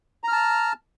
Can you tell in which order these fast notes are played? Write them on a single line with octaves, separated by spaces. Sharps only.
A#5 F6 A5